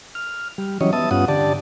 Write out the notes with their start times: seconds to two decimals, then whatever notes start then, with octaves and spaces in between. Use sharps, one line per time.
0.15 F6
0.58 G3
0.81 E3 F#3 G3 C#4 C#5 D#5
0.93 B3 E5 A5 D#6
1.11 G2 B3 C#4 F4 F#5 D#6
1.28 D3 G4 D5 A5